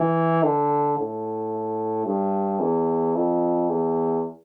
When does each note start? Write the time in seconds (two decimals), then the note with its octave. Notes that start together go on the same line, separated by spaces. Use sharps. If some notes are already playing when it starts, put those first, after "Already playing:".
Already playing: E3
0.43 D3
0.98 A2
2.06 G2
2.60 E2
3.15 F2
3.69 E2